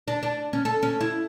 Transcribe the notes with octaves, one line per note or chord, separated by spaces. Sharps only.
D4
D4
C#4
A4
C#4
E4